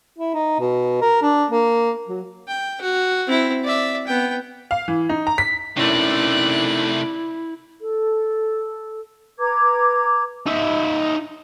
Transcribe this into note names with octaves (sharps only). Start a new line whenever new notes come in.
E4
D#4
B2
A#4
D4
A#3
F#3
G5
F#4
C4 E4
D5 E5
B3 G5
F5
E3
D#4
A#5
B6
C3 A3 C#4 D#4 E4 A#4 D5 F#6
A4
B4 A#5 D6 G#6
D#4 E5